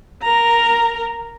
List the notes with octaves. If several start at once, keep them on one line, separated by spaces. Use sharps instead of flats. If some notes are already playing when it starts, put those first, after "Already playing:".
A#4 A#5